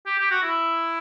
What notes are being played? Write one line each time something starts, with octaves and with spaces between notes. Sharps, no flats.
G4
G4
F#4
E4